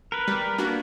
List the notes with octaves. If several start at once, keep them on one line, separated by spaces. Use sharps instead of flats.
A#4 B4
G3
A#3 B3 D4 F#4